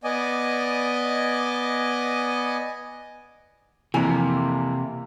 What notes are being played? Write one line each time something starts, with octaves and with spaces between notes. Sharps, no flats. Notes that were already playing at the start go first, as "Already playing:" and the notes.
B3 D5 D#5 G#5
F2 C3 E3 A#3 G#5